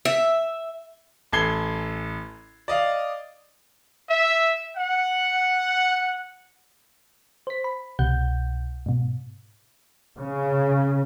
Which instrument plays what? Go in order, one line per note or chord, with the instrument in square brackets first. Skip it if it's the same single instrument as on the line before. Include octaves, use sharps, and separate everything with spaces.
[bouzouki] E5
[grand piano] A1 A4 G#6 C7 G7
D5 D#5 F5
[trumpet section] E5
F#5
[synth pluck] C5 B6
B5
C2 B2 F#5 G6
G#2 B2
[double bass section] C#3